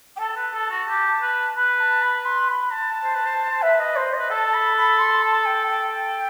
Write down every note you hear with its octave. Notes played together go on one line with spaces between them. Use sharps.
G5
A4 A5
B4
A4
F#4
G4
B4
B4 B5
A5
B5
C6
B5
A5
C5
B4
C5
C5
B4 E5
D#5
C5
D#5
B4
A4 A5
B5
B5
C6
A5
G5
G5